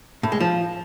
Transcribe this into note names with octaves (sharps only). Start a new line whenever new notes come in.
A2
G#3
F3